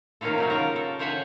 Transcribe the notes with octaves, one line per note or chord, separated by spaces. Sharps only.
C3 D#3 A#3 C#4 F4 A4
C#3 F#3 G4
F4 A4 A#4
A4
C#3 C5 C#5 E5 F#5 G#5